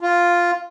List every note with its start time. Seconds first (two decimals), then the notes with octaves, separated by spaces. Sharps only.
0.01 F4